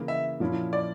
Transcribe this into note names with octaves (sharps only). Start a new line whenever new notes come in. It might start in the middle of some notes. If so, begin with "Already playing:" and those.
Already playing: C#3 E3 A#3
E5
A#2 F3 C#4 E4
D5